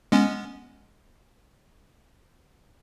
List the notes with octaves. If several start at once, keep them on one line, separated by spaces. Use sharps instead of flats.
G#3 B3 C#4